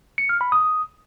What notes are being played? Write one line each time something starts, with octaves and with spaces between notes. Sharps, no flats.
C#7
F6
B5
D#6